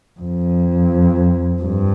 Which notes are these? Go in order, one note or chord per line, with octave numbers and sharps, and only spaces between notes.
F2
G2